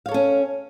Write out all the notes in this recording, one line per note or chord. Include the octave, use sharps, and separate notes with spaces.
C#4 A4 C#5 F5